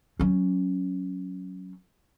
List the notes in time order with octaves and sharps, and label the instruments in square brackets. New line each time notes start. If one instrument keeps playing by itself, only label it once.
[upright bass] F#3 C#4